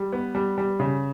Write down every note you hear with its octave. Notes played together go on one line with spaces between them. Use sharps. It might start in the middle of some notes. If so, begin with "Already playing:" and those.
Already playing: G3
B3
G3
G3
C#3